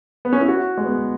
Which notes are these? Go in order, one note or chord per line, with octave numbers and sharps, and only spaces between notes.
B3
C#4
E4
F#4
G#3
B3